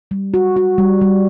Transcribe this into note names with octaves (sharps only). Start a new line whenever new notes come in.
G3
F#4
F#4
G3
G3